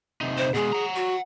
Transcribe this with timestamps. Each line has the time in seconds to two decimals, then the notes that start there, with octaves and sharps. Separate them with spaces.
0.21 C3 D#4
0.37 C5
0.54 B2 G#3 G#4
0.73 F#5 A#5
0.96 F#4